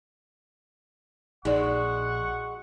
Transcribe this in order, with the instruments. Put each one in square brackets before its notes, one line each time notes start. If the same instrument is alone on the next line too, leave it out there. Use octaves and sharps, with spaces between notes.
[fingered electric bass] A#1 [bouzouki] G#3 F#4 [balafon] D#4 D5 [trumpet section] F#5 C#6